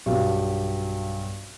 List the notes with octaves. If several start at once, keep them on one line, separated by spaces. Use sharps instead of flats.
B1 G2 F#3 G4